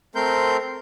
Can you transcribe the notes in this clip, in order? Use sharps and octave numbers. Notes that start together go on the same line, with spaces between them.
A3 C4 A#4 C6 G6